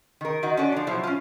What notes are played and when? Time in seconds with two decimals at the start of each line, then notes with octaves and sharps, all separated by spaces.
0.21 D#3 A#4
0.43 D#3 D#4 F#4
0.57 C#4 F#4 A4 D5
0.72 F3 D4
0.87 B2 F3 F#3 E4 C5
1.03 C#4 F4